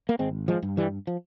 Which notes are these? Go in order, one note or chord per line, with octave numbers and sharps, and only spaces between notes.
A#3
G#1 G#3 C4
F3 G#3
G2
E3 G3
F3